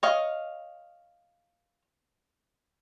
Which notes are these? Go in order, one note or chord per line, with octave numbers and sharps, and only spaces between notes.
C#5 D#5 F5